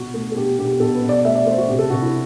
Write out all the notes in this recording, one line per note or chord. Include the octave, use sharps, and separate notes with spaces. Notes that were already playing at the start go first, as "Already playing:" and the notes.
Already playing: B2 F#4
A3
A4
B2 G4
B2 G4
G4
B2 A4
B4
B2
D5
A3 E5
D5
A3 C5
F#4
C3 G4
A4
C3 F#4
E4